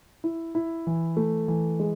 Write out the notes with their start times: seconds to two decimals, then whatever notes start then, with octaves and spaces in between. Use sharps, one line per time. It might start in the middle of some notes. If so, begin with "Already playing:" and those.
0.24 E4
0.55 E4
0.87 E3
1.17 A3
1.48 E3
1.80 G#3